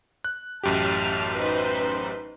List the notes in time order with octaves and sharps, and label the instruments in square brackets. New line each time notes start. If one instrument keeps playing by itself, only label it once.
[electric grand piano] F#6
[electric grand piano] A1 F#2 G4 [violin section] A5 F6
[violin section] D#4 B4 C5